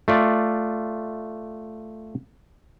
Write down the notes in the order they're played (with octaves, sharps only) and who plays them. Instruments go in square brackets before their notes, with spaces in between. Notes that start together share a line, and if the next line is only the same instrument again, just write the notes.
[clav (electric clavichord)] A3 F4 D5